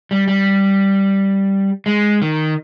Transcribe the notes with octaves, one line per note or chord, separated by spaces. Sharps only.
G3
G3
G#3
D#3